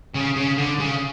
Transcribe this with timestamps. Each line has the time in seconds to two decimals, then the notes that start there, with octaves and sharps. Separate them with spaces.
0.15 C#3
0.36 C#3
0.57 D3
0.79 C#3